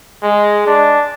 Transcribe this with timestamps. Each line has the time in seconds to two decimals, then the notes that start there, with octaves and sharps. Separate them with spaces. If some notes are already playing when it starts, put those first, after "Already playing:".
0.23 G#3
0.67 D4